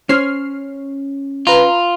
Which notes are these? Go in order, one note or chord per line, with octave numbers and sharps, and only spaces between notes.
C#4 C5 C#5 F6 C7
F4 B4 A#5